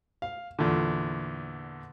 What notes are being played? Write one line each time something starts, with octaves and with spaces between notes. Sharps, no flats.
F5
E2 A#2 D3